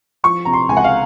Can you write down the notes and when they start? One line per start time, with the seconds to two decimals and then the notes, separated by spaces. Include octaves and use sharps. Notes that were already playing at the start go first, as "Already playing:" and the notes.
0.24 F3 C#6
0.45 C3 A#5
0.53 C6
0.68 C#2 G#5
0.77 F#5
0.84 F5